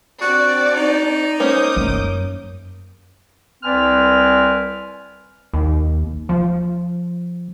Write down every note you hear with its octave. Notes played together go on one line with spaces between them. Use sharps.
C4 D4 F#4 D5
D#4
A#3 C#4 C5 D6 D#6 G6
F#2
C2 C4 B4 D5 G#5 F6
D#2
F3